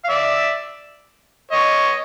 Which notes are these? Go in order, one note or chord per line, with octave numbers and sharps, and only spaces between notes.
F5
D5 E5
C#5 D#5